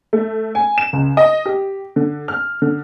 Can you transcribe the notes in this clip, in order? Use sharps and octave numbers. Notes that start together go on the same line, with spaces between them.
A3
G#5
E7
C#2
D#5
G4
D3
F6
D3